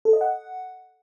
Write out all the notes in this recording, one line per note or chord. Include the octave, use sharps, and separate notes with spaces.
A4
D#5
F#5